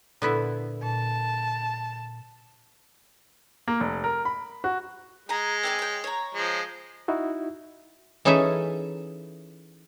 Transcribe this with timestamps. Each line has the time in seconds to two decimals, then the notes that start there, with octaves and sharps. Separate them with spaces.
0.22 A#2 D3 B3 E4
0.83 A#2 A5
3.68 A#3
3.80 F1
4.04 A#4
4.25 B5
4.64 F#4
5.29 G#3 G#5 A#5
5.63 C4 D5 G#5
5.79 C#5 G5
6.04 C#5 A#5
6.35 F3 G#3
7.08 D#4 E4 F#4
8.25 E3 C#4 D#4 G#4 A4 E5